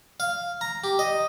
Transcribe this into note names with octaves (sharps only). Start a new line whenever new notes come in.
F5
A#5
G4
D#5